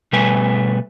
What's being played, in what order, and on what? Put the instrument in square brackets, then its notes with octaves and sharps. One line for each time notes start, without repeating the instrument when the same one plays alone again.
[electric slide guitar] B2 G3 A3 B4 G#5